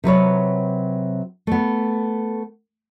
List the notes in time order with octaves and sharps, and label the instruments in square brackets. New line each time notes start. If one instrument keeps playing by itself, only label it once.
[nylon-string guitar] C3 F#3 B4 C#5
A3 B3